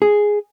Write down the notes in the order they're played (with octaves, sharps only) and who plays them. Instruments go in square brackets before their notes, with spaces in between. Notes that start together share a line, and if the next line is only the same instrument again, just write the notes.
[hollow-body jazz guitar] G#4